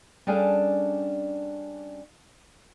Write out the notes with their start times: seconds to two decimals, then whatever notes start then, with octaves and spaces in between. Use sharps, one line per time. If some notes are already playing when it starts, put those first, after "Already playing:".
0.27 G3 C#4 D4 G#4 A4 F5